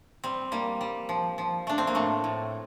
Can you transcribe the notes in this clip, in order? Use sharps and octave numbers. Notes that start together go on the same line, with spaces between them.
G3 C4
G3 A#3
G3
F3
F3
A3 D4
C4
A#3
A2 A3
A2